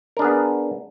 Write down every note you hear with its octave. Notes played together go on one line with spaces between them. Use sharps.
B3 D4 G#4 A#4